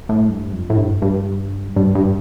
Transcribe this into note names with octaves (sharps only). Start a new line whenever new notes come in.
A2
G2
F2
A2
G2
G2
G2
G2